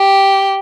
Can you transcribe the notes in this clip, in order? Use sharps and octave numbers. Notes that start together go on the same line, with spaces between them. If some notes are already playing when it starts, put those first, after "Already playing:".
Already playing: G4